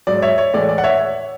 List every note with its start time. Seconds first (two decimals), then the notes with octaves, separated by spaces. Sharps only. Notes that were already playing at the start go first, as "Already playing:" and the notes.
0.07 G#2 F#3 D5
0.22 C#5 E5
0.38 C#5
0.54 A2 E3 G#3 D5
0.69 D5
0.78 F#5
0.84 C#5 E5